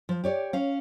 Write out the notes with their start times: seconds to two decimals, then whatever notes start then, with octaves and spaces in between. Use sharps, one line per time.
0.09 F3
0.24 G4 C#5 D5
0.53 C#4 F5